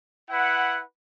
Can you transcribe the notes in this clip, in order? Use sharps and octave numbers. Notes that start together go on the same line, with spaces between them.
E4 B4 F#5